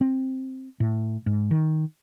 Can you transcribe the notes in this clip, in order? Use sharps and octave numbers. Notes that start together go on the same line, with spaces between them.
C4
A2
G#2
D#3